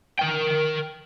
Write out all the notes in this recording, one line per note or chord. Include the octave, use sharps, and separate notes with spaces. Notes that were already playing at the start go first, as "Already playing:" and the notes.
A#4 G5